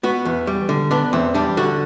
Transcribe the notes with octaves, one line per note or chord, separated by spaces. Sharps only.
B3 F#4
E2
G3
D3
B3 D4
E2 C4
G3 D4
D3 F#4